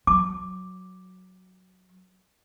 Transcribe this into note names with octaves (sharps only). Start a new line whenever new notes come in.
F#3 D6